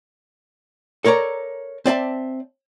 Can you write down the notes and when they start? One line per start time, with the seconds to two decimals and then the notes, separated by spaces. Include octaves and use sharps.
1.04 A4 A#4 C#5 D5 A#5
1.86 C4 D5 E5 A5